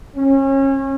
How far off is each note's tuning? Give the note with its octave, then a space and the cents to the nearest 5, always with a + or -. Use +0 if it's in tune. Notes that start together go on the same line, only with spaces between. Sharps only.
C#4 -30